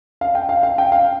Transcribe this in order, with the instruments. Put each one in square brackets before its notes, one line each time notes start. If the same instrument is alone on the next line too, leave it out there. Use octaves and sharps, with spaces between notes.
[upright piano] F5
G5
F5
F5
G5
F5